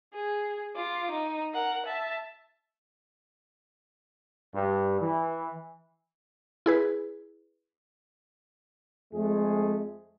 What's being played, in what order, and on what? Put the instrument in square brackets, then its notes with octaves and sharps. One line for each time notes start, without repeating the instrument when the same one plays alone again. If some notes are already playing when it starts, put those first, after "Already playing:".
[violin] G#4
F4 D6
D#4
A#4 F#5
E5 A5
[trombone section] G2
E3
[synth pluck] E4 G#4 B4
[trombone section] F2 G#3 A3 G#4